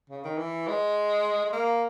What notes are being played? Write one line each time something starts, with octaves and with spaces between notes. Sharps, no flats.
C#3
D#3
E3
G#3
G#3
A#3